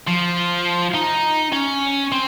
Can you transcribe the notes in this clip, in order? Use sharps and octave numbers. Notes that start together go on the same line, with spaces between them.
F3
D#4
C#4
C4